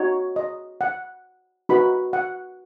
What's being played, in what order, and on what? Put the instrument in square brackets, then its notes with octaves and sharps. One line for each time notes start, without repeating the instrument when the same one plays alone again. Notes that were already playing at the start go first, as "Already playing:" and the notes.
Already playing: [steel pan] D#4 F#4 C#5
D#5
F#5
D#4 F#4 B4 B5
F#5